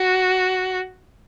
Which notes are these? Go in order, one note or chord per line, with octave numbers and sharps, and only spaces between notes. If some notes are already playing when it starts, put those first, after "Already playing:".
Already playing: F#4